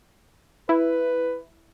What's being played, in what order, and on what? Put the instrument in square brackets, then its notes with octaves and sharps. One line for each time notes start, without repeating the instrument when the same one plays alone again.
[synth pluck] E4 [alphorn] B4